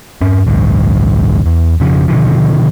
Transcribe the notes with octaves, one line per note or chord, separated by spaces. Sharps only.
G2 C#4
A1 D2 G2
E2
F2 C#3 F3
B2 D3 D#3 F3